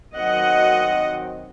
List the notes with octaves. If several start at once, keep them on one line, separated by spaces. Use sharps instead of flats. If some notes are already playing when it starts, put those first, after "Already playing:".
D#3 F#3 C4 D#5 F#5